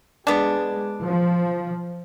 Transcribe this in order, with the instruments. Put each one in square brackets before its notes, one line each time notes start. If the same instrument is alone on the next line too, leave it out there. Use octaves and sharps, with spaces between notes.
[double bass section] G#3 [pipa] B3 D4
[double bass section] F3